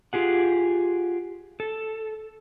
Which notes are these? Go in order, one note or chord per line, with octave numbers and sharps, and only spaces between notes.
F4 G4 G#4 F#5
A4